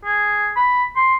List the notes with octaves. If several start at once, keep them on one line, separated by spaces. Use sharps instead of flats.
G#4
B5
C6